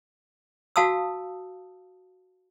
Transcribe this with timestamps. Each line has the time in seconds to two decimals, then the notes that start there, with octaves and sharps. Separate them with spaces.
0.76 F#4 F5 A5 D#6 E6